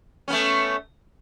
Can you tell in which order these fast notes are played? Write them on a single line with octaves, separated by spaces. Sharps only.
C#4 B3 A3